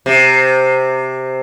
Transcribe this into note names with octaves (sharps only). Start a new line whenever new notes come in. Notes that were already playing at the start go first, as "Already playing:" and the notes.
C3